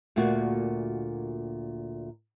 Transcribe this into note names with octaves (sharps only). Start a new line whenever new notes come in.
D2 A#2 A3 A#3 F#4